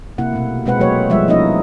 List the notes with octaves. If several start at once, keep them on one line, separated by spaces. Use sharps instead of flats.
C3 A#3 E4 F#5
B2 A3
B2 G#3 C4 B4 F#5
F#3 A3 A#3 B4 C#5
F3 G3 G#3 E5
F3 A#3 C#4 D#4 E4 D#5